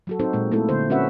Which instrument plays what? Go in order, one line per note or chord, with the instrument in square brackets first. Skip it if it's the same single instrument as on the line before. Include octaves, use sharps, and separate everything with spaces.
[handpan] F#3 F#4 A4
C4 D#4 F#4 A4 C5
A#2 G#3 A#3
A3 C4 E4 A4
D3 C5
C4 C#4 F#4 B4 E5 F#5